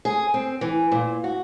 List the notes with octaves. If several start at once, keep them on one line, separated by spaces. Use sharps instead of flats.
G#4
C4
E3
A#2
F#4